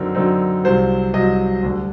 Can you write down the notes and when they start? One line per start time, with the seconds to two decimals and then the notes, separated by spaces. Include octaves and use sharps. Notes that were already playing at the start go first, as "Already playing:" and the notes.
Already playing: F#2 D3 F#3 C4 D#4 A#4
0.15 F#2 D3 F#3 C4 D#4
0.64 C2 C3 F#3 C5
1.14 C2 C3 F#3 D#5
1.63 D2 D3 G3 D4